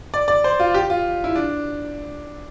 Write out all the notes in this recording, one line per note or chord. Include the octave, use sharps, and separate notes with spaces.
D5
D5
C5
F4
G4
F4
E4
D4